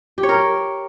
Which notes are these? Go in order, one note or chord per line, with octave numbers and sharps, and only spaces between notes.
G4
C#5
A#4